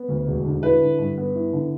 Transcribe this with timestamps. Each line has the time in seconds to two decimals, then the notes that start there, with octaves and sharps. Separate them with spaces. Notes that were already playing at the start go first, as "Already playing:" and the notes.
Already playing: B3
0.08 D2
0.27 E1
0.45 D3
0.63 E4 B4
0.81 D3
0.99 G2
1.18 B3
1.35 E4
1.53 D3